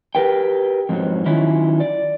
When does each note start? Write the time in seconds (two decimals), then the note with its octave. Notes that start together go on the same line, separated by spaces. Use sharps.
0.15 G4 A#4 B4 G5
0.89 F2 G#2 F3 F#3
1.25 D#3 F#3 C#4 E4 F4
1.80 D5